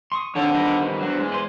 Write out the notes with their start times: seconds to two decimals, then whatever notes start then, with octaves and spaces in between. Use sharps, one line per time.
0.12 C6 C#6 D#6
0.35 D3 D#3 C4 C#5
0.54 D#3 G3 B3 C5 D#5
1.01 E2 F#3 D4 F#4 C5
1.19 G#3
1.32 B4 C5 C6